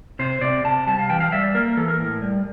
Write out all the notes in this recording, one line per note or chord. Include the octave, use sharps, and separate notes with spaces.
C3 C5
C3 D5
C3 A5
G3 A5
F5
E3 G5
F5
G3 E5
D5
A#3 A#4
E3 A4
A#4
A2
G3